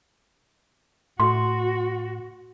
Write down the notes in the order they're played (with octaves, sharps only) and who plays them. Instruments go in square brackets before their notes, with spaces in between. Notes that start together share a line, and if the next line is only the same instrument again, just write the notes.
[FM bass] A2 [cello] F#4 [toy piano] C6